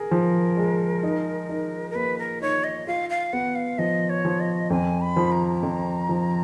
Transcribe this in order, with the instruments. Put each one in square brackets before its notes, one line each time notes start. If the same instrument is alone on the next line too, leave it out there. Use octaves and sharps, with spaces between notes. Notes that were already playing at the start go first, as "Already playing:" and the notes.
Already playing: [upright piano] G#4 [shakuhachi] A#4
[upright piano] F3
G#3
D#4
D#4
[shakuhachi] A#4
[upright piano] A#3 [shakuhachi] B4
[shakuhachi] A#4
[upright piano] D#4 [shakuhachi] C#5
[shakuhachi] D#5
[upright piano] F4 [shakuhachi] F5
[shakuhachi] F5
[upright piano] B3 [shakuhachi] F#5
[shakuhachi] F5
[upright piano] F3 [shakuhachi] D#5
[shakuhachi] C#5
[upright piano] F3
[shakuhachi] D#5
[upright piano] F2 [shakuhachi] G#5
[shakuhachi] B5
[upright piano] F3
[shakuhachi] A#5
[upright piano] F2
F3